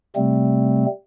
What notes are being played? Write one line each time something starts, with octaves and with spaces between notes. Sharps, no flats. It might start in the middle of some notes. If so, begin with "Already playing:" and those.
C3 G3 A3 C4